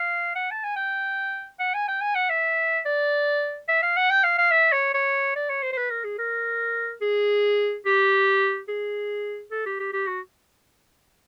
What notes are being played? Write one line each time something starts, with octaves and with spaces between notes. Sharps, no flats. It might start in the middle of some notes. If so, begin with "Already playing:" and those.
Already playing: F5
F#5
A5
G#5
G5
F#5
G#5
G5
G#5
F#5
E5
D5
E5
F5
F#5
G5
F5
F5
E5
C#5
C#5
D5
C#5
C5
C5
B4
A#4
G#4
A#4
G#4
G4
G#4
A4
G4
G4
G4
F#4